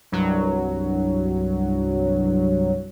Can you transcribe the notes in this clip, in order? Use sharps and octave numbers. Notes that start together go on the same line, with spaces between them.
C2 G2 F#3